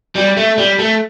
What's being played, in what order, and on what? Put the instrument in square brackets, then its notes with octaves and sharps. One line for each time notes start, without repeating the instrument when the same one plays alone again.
[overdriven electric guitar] G3
A3
G3
A3